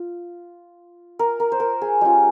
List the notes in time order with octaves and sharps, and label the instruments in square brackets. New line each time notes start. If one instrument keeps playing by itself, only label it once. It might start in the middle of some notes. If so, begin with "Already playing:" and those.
Already playing: [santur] F4
A#4
A#4
C5
A#4
G#4
G#3 C#4 F4 G4